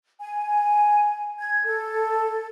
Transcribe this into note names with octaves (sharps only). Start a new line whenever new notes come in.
G#5
G#6
A4